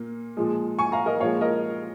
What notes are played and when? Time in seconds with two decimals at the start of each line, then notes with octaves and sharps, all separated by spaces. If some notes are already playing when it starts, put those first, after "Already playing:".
Already playing: A#2 A#3
0.37 A#2 F3 G#3
0.79 G#5 C#6
0.92 F5 A#5
1.06 A#4 D#5
1.20 A#2 F3 G#3 C#5 F5
1.41 A#4 D#5